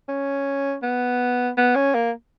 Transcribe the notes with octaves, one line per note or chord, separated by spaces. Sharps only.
C#4
B3
B3
C#4
A#3